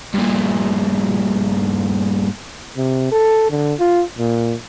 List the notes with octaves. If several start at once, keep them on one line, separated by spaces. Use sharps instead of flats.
G2 A#2
C3
A4
D3
F4
A#2